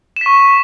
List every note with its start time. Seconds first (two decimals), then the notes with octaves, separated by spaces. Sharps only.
0.16 E7
0.21 B6
0.26 C#6